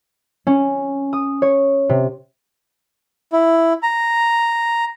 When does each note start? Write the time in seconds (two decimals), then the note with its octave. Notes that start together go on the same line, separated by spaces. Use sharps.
0.47 C#4
1.13 D#6
1.42 C#5
1.89 C3
3.33 E4
3.83 A#5